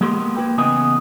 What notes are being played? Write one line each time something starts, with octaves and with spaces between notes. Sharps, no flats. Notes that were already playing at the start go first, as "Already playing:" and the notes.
G#3 A#3 B3 G4 A4 C6
A#3 F#4 B4 G5
E2 C#3 A3 B3 D#5 G#5